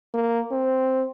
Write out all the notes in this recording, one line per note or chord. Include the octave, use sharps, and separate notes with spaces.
A#3
C4